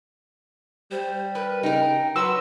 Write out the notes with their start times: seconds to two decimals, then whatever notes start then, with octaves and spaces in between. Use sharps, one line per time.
0.91 G3 C5
1.35 A#4 B4
1.63 C#3 D#4 A#4 G5
2.16 F#3 F#4 B4 C6 E6